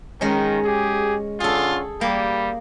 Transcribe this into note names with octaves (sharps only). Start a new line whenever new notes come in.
D#3 G#3 C#4
G4 G#4
D3 C#4 F4 G#4 A4
G3 A#3